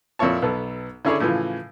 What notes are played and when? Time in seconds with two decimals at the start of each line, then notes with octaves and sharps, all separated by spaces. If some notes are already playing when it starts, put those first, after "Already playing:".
0.19 F2 A#2 E4 C#5 A5
0.42 B1 B3 A4
1.05 D3 C#4 E4 G#4 C#5 D5
1.20 A2 C#3 E3 F3